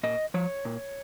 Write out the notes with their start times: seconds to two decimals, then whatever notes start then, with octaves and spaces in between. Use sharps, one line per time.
0.03 A#2 D#5
0.34 F3 C#5
0.65 A#2